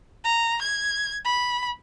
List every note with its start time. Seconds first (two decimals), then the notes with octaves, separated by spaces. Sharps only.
0.25 A#5
0.62 G#6
1.25 B5